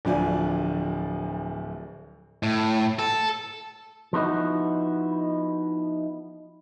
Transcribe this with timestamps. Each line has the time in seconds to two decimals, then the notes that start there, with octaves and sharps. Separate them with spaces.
0.05 D1 D2 F3 D5 G#5
2.43 A2
2.99 A4
4.13 F3 B3 D#4 E4 F#4